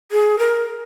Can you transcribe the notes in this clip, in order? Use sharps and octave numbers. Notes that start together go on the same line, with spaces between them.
G#4
A#4